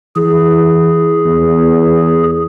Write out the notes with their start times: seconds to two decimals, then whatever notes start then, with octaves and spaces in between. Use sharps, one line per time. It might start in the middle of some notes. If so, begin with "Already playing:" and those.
0.16 E3 G#4
1.25 E2